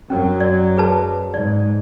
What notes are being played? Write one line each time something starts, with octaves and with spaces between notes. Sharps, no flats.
F#2 F#3 C#4
D5
G#4 B4 A5
G#2 D5